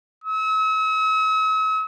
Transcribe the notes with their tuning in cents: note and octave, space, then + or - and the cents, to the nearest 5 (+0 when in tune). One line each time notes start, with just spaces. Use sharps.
E6 -45